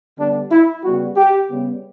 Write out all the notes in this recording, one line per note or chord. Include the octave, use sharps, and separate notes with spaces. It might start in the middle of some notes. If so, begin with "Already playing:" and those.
D3 G3 B3 D4
E4
C#3 G3 B3 F#4
G4
C#3 G3 B3